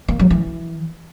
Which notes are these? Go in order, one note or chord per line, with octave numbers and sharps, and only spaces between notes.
A#3
F#3
E3